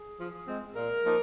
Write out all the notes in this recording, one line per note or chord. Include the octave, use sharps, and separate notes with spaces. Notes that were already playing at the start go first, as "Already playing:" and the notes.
Already playing: G#4
F3
G#3 C4
A#2 A#4
F3 A#3 D#4